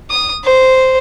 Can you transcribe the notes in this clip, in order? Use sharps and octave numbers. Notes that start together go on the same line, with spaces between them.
D#6
C5